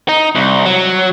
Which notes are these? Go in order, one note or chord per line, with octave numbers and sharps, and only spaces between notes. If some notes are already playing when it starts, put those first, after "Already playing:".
D#4
C2
F#3